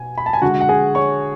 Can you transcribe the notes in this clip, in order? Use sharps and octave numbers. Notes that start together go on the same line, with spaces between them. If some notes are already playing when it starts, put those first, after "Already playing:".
Already playing: B2 G#5
B5
A5
G#5
D3 G#3 F#4 F#5
F#5
G#4 G#5
C#5 C#6